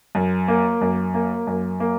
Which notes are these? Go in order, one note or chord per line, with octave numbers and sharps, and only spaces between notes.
F#2
A#3
F#2
A#3
F#2
A#3